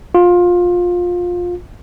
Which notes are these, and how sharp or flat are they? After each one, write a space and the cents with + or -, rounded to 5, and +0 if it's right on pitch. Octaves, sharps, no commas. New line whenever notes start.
F4 +20